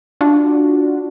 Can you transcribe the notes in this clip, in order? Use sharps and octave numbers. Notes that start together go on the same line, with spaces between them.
D4 F4 F#4